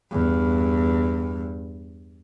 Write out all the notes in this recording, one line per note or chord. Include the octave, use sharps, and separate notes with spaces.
E2 G2